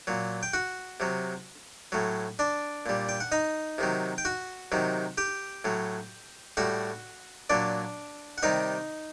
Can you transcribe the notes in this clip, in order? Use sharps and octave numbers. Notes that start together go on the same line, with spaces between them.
A#2 F#3
G5
F#4 F#5
C3 F#3
A2 F#3
D4 D5
A#2 G3
G5
F#5
D#4 D#5
C3 D#3 F#3
G5
F#4 F#5
C3 D#3 F#3
G4 G5
A2 F#3
A2 G3 F#4 F#5
A#2 F#3 D4 D5
F#5
C3 D#3 G3 D#4 D#5